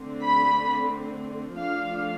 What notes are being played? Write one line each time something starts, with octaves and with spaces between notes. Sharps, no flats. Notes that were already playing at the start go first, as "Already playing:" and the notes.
Already playing: D3 A3 C4
B5
F3 A3 D4 F5